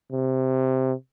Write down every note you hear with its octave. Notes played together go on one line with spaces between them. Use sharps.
C3